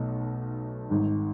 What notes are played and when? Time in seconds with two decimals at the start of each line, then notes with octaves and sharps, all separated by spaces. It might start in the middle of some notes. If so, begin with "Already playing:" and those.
Already playing: B1 B2 A3 D#4
0.90 G#1 G#2 D#3